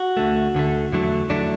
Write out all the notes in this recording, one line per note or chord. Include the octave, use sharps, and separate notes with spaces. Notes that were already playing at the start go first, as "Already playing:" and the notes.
Already playing: F#4
D2 D3 A3
D2 D3 A3
E2 D3 F#3 A3
E2 D3 F#3 A3 D4